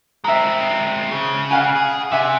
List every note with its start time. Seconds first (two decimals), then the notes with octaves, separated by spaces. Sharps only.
0.24 G#3 C4 E5 A#5
1.11 C#3
1.51 F5 F#5 G#5
1.76 G#4
2.12 C3 E5 F#5 G#5